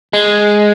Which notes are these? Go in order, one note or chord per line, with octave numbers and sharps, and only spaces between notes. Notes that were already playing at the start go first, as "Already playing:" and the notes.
G#3